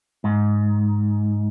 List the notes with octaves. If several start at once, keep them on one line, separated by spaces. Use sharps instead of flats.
G#2